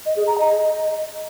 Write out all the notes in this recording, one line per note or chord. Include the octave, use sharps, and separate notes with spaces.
D#5
G#4
A#5
D#5